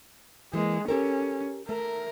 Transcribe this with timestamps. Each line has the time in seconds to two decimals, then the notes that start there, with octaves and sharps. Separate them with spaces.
0.54 E3 G#3 A#3
0.88 C#4 G4 A4 A#4
1.69 A3 A#4